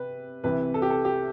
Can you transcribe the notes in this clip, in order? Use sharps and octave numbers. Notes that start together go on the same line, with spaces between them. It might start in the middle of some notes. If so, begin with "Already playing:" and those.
Already playing: C3 B4
C2 C3 E3 B4
A4
G4
A4
G4